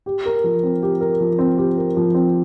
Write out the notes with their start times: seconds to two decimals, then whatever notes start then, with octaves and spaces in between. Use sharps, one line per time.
0.06 G4
0.26 A#4
0.44 F3
0.63 C4
0.82 G4
1.01 A#4
1.20 F3
1.39 C4
1.58 G4
1.77 A#4
1.97 F3
2.15 C4